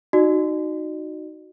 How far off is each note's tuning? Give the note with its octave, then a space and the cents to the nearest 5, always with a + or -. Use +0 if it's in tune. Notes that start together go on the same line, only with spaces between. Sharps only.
D#4 +0 F#4 +0 D5 +45